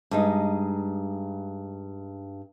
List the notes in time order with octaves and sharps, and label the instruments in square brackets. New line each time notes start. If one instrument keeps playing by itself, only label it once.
[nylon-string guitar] G2 G#3 D#4